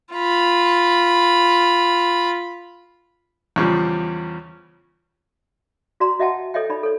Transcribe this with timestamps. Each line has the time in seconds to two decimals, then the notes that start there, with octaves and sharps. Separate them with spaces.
0.14 F4 B5
3.56 E2 C#3 F3 G3
6.00 F#4 D5 A#5 C6
6.19 F#4 D#5 E5 F#5 G5 A5
6.54 A4 C#5 D#5 E5 G5
6.70 D#4 D5 B5
6.83 A4 C#5